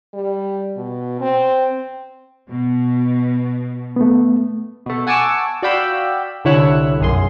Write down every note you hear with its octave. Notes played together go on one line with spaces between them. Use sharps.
G3
B2
C4
B2
A3 B3
B2 A3
F#5 G#5 A5 C#6 D6 E6
F#4 D5 F5 G5 B5 E6
C2 D3 E4 C#5 E6 F#6
B1 F#2 G#4 C6